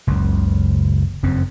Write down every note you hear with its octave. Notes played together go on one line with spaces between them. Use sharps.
F#1 C#2 F#2
F#1 F2 C#3 C4